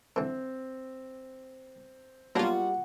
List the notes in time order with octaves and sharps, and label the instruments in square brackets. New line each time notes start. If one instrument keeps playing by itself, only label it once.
[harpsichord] D3 E3 [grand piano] C4
[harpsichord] F#3 B3 D4 [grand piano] G3 [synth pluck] A#3 F4 [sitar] F#4